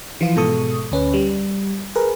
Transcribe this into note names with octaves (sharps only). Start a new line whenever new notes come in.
E3 F3 F4
G#2 B2 G#3 A4 C#6 D#6
D2 C#4 B4
G3
G#4 A#4 B4